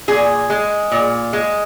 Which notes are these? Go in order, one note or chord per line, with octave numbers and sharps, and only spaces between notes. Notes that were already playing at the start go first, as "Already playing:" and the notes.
A#2 G#4
G#3
A#2
G#3